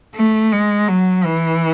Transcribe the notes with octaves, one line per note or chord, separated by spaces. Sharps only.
A3
G#3
F#3
E3